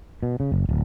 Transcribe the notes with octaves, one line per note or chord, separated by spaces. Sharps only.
B2
C#3
F#1
D1